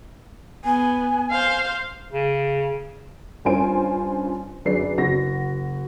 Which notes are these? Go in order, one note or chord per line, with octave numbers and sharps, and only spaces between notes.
B3 G#5
C5 F5
C#3
G2 C#4 F4 C5 G#5 D7
F#2 D3 G#4 B4 D5 C7
F#1 F#4 A#6